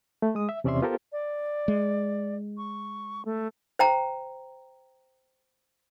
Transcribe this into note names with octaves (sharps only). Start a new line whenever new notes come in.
A3
G#3 D#6
E5
E2 C3 C#4 D5 E5 C6
B3 F4 G4 A4 A#4 C5
D5
G#3
C#6
A3
C5 G5 A#5